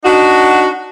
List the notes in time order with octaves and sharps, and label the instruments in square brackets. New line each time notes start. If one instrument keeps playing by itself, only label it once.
[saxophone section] D4 D#4 F#4